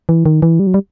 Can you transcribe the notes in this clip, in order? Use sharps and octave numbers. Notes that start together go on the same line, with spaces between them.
E3
D#3
E3
G3
F#3
G3